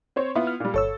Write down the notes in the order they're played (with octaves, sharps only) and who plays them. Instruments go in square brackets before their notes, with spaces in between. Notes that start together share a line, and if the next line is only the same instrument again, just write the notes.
[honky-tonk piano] C4 C5 C#5
B3 E4 F4
[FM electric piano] F6
[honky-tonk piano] A#2 G3
[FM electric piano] G1 C#5 E6 [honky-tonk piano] A4